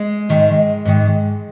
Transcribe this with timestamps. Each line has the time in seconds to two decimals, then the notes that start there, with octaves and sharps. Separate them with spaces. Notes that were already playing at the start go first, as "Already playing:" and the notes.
Already playing: G#3
0.29 G#2 D#3
0.85 G#2 D#3